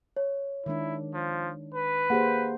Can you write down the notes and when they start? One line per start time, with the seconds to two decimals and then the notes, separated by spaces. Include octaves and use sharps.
0.17 C#5
0.66 D#3 G#3 D4 E4
1.14 F3
1.74 B4
2.10 A#3 G4 G#4 C5 F#5